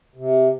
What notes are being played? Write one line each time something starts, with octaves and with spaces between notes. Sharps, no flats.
C3